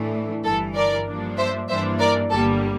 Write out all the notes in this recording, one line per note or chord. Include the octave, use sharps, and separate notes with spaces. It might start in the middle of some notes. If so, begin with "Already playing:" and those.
Already playing: A2 E3 A3 D4
G1 G2 E3 A4
A#4 D5
G2 F3 A#3 D4
C5 E5
G2 E3 A#3 D4 C5 E5
A#4 D5
G1 G2 D3 G3 A#3 A4